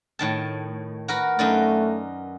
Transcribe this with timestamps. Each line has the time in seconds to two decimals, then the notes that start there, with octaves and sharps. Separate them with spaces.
0.19 A2 D#3 A5
1.08 F#4 A#4 B4
1.39 F#2 A3 D#4 D5